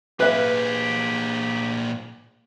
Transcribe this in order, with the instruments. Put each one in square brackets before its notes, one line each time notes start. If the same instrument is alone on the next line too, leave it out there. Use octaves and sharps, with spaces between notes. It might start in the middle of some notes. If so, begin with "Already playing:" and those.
[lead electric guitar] A#2 G#4 [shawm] G4 [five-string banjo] B4 E5 F5